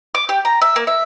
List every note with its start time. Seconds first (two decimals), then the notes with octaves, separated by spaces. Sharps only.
0.15 D6
0.29 G4
0.45 A#5
0.62 E5
0.76 A#3
0.87 E5